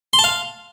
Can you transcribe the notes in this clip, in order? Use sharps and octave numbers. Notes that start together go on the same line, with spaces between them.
C6
A5
F5